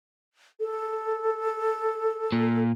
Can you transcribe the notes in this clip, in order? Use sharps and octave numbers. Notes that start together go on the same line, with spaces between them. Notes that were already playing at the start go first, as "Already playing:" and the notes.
A4
A#2